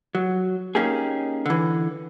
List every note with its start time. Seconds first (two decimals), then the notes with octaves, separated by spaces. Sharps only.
0.15 F#3
0.75 A#3 C#4 D#4 G4 G#4
1.46 D3 E3